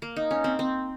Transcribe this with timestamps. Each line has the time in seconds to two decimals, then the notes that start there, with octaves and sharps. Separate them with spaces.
0.02 A#3
0.16 D#4
0.31 C#4
0.44 C4
0.59 C4